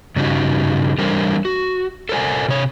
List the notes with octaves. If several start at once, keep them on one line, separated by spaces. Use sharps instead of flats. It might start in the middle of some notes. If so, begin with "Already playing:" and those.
G2 C#3 C#4 D#4 F#4 G4
E3 G3 D4 A4 A#4 C5
F#4
A4 A#4 C5 D5 G#5
C3 C#5